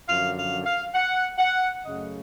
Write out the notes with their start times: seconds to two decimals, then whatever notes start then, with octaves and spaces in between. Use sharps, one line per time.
0.08 F#2 D3 F3 F5
0.36 F5
0.66 F5
0.94 F#5
1.38 F#5
1.82 F#2 C#3 F#3 A3 D#5